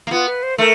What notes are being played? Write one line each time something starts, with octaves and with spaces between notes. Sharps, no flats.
A#3
B3 F4
B4
C5
A3 A#4